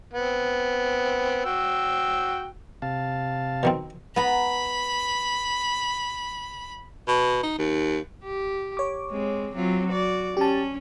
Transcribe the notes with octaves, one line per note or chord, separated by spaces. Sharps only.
B3 C4
F#4 G5 E6
C3 F5 A5
B2 D#3 C4
B3 A#5 B5
B2
D#4
D#2
G4
C#5 D6
G#3 C4
F#3 C4 F4
F#4 D5
C#4 G4 A5